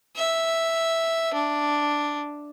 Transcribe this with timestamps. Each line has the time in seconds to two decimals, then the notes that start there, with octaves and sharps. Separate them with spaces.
0.16 E5
1.34 D4